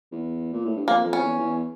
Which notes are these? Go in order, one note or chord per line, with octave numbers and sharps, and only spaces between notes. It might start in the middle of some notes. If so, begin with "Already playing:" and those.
E2
A#2
A2
G2
F2 A#3
F2
C#4
E2
E2